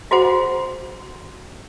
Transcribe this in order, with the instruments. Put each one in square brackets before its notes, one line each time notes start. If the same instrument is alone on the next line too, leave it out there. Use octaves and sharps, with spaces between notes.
[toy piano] F4 F#4 G#4 C5 F#5